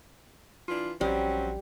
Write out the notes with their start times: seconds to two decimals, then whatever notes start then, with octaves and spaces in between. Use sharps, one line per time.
0.69 E3 D4 F4
1.01 A#1 F#3 G3 C4 C#4